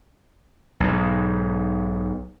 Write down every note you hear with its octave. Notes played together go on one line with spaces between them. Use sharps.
B1 G#2